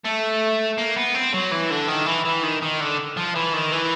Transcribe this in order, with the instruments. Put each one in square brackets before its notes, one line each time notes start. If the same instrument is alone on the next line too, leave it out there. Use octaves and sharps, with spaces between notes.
[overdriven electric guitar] A3
A#3
B3
C4
F#3
E3
D3
D#3
E3
E3
D#3
D#3
D3
F3
E3
D#3
E3